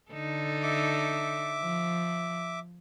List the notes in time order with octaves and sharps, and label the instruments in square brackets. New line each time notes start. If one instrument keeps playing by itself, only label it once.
[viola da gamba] D3 D#4 A4
[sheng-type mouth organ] E5 D6
[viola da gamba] F3